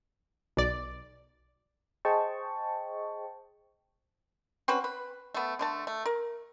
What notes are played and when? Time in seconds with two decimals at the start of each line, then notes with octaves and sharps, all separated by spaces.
0.57 B1 D5
2.05 G#4 C5 D#5 G5 A5 C#6
4.68 C4 C#4 F#4 B4
4.84 B4
5.34 A3 B3
5.59 D3 A3 A5
5.87 A3
6.06 A#4